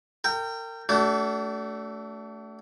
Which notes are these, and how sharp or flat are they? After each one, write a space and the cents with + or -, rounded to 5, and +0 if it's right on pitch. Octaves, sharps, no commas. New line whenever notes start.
A#4 -35 G5 +0
A3 +0 D4 -35 F#4 +40